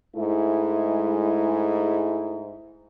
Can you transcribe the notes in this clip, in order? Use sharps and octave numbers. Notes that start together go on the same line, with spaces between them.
G#2 G#3 A3 E4